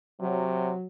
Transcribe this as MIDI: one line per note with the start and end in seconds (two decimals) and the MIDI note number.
0.21 0.72 48
0.21 0.86 54